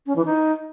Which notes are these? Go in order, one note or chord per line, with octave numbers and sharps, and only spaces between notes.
C#4
E3
D#4